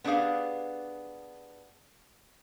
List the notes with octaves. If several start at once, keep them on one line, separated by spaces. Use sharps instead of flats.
B3 D4 G4 G#4 F5